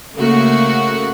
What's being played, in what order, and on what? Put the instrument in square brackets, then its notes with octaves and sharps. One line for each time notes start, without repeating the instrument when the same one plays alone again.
[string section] C#3 A3 A#3 F#4